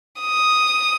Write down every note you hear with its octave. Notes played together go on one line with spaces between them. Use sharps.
D#6